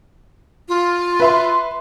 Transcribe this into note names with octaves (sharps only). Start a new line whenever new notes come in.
F4
B4 E5 C6